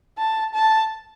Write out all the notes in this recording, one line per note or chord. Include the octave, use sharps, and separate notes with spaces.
A5
A5